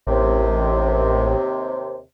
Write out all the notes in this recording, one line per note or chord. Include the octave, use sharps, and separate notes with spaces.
A1 D#2 C3